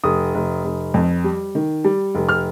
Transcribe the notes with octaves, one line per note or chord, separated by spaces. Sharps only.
F1 D#6
F1
F1
F2
G3
D#3
G3
F1
F6